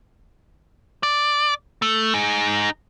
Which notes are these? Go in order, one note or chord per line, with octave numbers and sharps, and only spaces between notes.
D5
A3
D#4 G#4